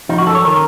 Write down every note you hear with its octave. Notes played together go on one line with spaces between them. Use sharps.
F3 D#4
F#4
F#2 A4
C#5
D#3 A#4